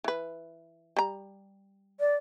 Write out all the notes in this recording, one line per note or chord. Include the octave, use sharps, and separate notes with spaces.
E3 B4
G3 A#5
D5